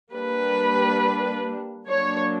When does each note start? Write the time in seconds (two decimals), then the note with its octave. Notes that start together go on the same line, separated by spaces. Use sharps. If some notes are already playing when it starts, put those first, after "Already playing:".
0.14 G3 A#3 D4 B4
1.88 F#3 A#3 D4 C#5